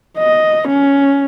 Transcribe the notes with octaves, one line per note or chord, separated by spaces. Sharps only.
D#5
C#4